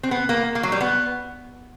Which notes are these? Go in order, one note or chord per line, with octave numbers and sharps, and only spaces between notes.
C4
B3
A#3
A#3
F#3
G3
B3